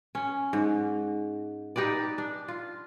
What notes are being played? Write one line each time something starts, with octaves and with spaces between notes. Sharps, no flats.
C#4
G#2
D#4 G4 B4 D5
D4
F4